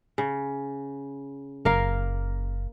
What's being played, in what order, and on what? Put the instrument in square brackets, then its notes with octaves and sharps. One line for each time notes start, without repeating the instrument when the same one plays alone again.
[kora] C#3
[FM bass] F#1 [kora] A#3 A#4 F5